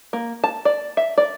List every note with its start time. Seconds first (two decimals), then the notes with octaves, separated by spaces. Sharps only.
0.13 A#3
0.44 A5
0.65 D5
0.97 E5
1.18 D5